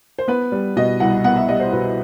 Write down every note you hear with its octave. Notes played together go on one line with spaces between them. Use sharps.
C5
B3 B4
G3
B2 D#5
C2 F#5
B3 F#5
E5
G3 D#5
C5
B2 B4